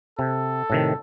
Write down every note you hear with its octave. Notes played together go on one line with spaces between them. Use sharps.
C3 A4
A2 C3 D#3